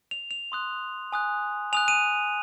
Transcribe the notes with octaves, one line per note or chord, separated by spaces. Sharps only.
F7
F7
C6 D#6 F#6
G#5 D#6 F#6
G#5 D#6 F#6 F7
D#7